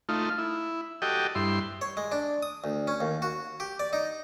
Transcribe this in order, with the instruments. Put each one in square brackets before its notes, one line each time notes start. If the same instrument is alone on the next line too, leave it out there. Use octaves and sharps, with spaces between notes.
[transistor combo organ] A3 D#4 F4
E4
F#4 G4 A4 D#5 G5
G2 E4 C6
[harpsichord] C#5
G#3
D4
D#6
D2
C#4
D#2
F#4
G4
D5
D#4